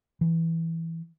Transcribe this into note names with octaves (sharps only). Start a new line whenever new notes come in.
E3